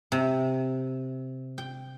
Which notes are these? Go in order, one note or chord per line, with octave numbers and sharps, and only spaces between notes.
C3
G5